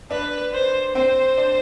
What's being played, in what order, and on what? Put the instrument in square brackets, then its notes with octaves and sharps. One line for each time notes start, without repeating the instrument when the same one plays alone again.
[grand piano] D4 [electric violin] B4
[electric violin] C5
[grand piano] C4 [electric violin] C5
[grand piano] D4